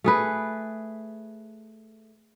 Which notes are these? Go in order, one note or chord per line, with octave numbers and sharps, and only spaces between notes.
A3 G#4 B4